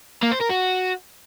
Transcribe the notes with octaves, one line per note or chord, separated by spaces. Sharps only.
A#3
C5
A#4
F#4